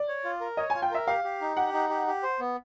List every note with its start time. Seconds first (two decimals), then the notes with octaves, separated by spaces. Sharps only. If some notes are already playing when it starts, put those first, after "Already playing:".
Already playing: D5
0.08 C#5
0.25 F4
0.41 A#4
0.57 C#5 D#5
0.70 G#5
0.74 F4
0.82 G5
0.91 A#4 E5
1.07 G4 F5
1.24 G4
1.41 D#4
1.56 G4 F#5
1.73 D#4
1.90 G4
2.07 G4
2.23 C5
2.39 B3